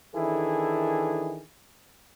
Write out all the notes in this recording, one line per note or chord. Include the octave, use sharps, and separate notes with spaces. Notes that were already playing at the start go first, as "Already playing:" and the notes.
D#3 E3 D4 E4 G#4 A4